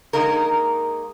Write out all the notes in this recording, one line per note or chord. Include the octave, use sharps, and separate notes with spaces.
G#3 A#3 D#4 A#4